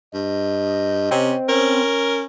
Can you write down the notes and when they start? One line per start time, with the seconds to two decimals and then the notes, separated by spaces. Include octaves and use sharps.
0.14 G2 D#5
1.11 C3 C4 C#4
1.48 C#4 A#4